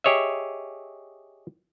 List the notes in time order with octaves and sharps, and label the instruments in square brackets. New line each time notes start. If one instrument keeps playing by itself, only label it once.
[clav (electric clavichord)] G4 G#4 C#5 D#5 E5